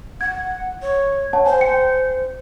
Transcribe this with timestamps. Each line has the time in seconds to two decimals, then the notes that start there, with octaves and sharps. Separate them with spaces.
0.21 F#5 G#6
0.82 C#5
1.33 C#5 F#5 A5
1.46 C5 G#5
1.61 G5 C#7